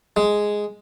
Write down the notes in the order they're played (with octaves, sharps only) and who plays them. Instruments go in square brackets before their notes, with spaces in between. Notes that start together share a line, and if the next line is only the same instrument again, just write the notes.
[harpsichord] G#3